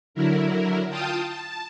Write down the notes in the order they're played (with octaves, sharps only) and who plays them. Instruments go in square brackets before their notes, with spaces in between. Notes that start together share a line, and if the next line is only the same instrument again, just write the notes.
[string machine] D3 F#3 E4 A#4
F4 F5 G5 A5 D#6
A5